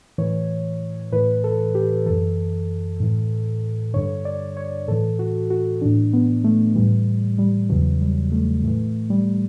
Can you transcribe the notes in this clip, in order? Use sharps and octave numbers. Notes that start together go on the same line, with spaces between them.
A2 E3 C#5
A2 E3 B4
A4
G4
F#2 E3 A4
A2 E3
G2 D3 C#5
D5
C#5
A2 E3 A4
F#4
F#4
A2 E3 D4
B3
A3
A2 E3 G3
G3
E2 C#3 E3 F#3
G3
A3
A2 E3 A3
G3